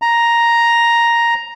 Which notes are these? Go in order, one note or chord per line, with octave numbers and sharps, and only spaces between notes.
A#5